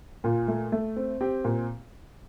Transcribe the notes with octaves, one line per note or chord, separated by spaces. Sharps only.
A#2 F4
A3
A3
C4
C4 G4
A#2